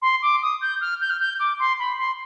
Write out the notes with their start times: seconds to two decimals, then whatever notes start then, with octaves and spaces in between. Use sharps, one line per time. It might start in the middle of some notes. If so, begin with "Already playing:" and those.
0.02 C6
0.22 D6
0.42 D#6
0.61 G6
0.81 F6
1.01 G6
1.10 F6
1.20 G6
1.40 D6
1.59 C6
1.79 B5
1.98 C6